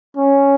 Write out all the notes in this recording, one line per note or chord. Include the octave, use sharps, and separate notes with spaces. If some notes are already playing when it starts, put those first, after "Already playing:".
C#4